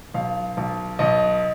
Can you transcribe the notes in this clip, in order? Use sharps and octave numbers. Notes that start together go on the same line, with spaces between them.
B1 F5
B1
B1 D#5